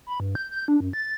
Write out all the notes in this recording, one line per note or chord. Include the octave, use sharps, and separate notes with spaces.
B5
G2
G6
G6
D4
F#2
A6